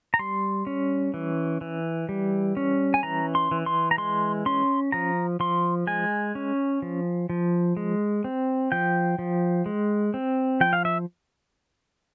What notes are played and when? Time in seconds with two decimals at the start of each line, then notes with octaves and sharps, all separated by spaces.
0.14 A#5
0.19 G3 C6
0.67 C#4
1.14 E3
1.61 E3
2.09 G3
2.57 C#4
2.94 G#5
3.03 E3 A#5
3.35 C6
3.51 E3
3.66 C6
3.91 A#5
3.98 G#3 C6
4.46 C#4 C6
4.92 F3 A#5
5.40 F3 C6
5.87 G#3 G#5
6.35 C#4
6.82 F3
7.29 F3
7.77 G#3
8.24 C4
8.72 F3 G5
9.19 F3
9.66 G#3
10.14 C4
10.61 F3 G5
10.73 F5
10.85 E5